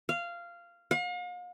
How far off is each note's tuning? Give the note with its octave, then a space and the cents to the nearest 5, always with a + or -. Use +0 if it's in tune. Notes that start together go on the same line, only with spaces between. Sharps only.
F5 -15
F5 +45